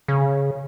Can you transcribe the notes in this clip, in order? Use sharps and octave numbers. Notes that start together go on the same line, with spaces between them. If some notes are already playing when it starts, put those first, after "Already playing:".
C#3